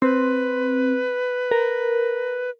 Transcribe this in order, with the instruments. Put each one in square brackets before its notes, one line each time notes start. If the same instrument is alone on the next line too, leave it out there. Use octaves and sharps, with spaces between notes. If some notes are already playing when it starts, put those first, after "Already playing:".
[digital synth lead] C4 [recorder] B4
[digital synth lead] A#4